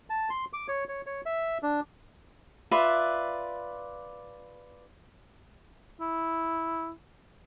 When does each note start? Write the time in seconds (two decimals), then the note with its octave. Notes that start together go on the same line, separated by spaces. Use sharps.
0.10 A5
0.30 C6
0.53 D6
0.68 C#5
0.89 C#5
1.06 C#5
1.26 E5
1.63 D4
2.71 F4 B4 D5 E5
6.01 E4